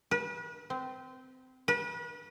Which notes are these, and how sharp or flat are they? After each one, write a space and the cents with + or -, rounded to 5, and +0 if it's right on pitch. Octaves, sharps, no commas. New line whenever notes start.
B4 -35
C4 -20
B4 -35